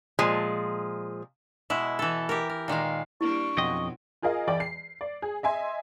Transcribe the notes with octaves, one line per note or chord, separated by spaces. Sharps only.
A#2 F3 G#3
B2 G#3 E4
E3 A4
G4 A#4
A#4
A#2 D#3 G#3 F5
G3 A#3 D4 E4 C#6
F2 B2 F#3 D#5 G5 C6
F4 G#4 A#4 D#5 F5
E2 D5 G5 D6
C7
D5
G#4
D#5 E5 G#5 C6